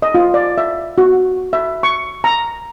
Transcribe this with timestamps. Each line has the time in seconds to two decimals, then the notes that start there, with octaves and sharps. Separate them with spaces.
0.02 D#5
0.15 F4
0.34 D5
0.58 E5
0.98 F#4
1.53 E5
1.83 C#6
2.24 A#5